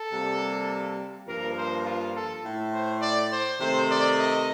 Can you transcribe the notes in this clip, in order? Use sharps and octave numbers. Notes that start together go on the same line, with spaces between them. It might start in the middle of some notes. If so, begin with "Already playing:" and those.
Already playing: A4
C3 G3 A#3
G2 F3 A#3 A#4
C5
F4
A4
A2 A3
C5
D5
C5
C3 D#3 A3 C5
D5
D#5